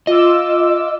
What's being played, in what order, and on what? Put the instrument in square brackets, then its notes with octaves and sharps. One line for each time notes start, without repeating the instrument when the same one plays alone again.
[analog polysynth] F4 D6 E6 [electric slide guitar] D#5